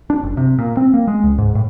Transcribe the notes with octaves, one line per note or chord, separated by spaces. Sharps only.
D4
F#1
C3
A#2
C4
A#3
G#3
C#2
G#2
A2